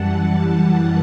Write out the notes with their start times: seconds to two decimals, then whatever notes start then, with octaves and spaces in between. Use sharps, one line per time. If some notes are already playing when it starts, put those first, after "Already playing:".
Already playing: F#2 E3 G3 F#5 A5
0.29 F#5 A5